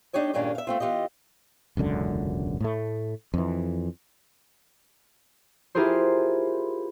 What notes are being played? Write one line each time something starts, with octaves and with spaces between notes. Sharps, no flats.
D4 D#4 G4 C#5 D#5
G2 A#2 D#3 G#3 C#4 D4
E5 F5
A3 C4 F4
E3 F4 G4 D#5
E1 C#2 F#2 D3
A2 A3
F2 E3
E4 F4 G4 G#4 A#4 C5